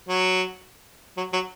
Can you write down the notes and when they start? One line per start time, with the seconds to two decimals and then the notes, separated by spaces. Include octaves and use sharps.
0.09 F#3
1.17 F#3
1.33 F#3